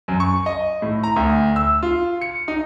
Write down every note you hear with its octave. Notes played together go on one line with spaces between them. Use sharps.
F#2
C#6
D#5
A2
A#5
D2
E6
F4
C#7
D#4